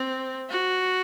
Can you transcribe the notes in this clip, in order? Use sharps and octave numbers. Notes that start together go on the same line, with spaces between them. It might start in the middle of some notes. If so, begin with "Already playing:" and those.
Already playing: C4
F#4